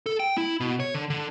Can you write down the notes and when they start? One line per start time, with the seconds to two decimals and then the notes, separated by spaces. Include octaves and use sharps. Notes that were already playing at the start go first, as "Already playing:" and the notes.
0.06 A4
0.20 G5
0.38 E4
0.60 B2
0.80 C#5
0.95 D3
1.10 D3